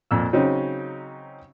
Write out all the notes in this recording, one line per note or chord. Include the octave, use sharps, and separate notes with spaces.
F2 A#2 E6
C#3 F#3 C4 C#4 D#4